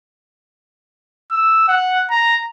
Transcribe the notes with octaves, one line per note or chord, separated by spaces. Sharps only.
E6
F#5
A#5